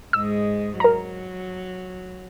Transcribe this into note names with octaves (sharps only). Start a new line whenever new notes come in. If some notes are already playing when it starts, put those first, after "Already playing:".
G#2 G#3 E6
F#3 A#4 A#5